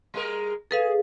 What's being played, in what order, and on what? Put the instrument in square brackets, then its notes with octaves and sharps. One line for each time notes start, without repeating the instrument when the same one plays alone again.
[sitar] G3 G#3 A#4
[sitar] G#4 [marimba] A4 B4 F5